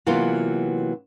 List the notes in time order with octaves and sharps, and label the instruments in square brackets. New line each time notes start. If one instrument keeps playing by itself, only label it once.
[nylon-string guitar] C3 E3 F#3 A#3 B3 F4